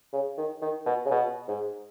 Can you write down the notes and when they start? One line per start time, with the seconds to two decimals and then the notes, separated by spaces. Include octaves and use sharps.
0.13 C#3
0.38 D#3
0.62 D#3
0.86 B2
1.05 C#3
1.11 B2
1.48 G#2